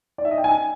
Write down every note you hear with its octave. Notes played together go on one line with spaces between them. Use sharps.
D5
E5
D#5
G5
G#5